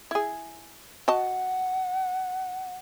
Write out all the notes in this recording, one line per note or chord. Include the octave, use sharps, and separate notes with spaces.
E4 G#4
F#4 D#5 F#5 A5